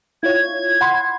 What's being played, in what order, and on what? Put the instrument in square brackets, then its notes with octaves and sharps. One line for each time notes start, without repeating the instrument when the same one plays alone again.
[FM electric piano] E4 F4 C#5 [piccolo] G#6
[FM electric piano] F#5 B5 C6